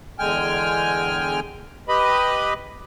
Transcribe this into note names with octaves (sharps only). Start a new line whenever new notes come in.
E2 D3 G#3 G5 G#5 F6
G4 B4 D#5 B5